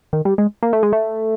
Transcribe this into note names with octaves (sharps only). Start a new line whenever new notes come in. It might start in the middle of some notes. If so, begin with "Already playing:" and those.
D#3
G3
G#3
A#3
A3
G#3
A3